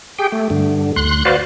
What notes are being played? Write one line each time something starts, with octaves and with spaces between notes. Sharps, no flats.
G4 G#4 G5
A3
G2 D3
D2 C6 F#6
F#4 B4 C5 D5 F5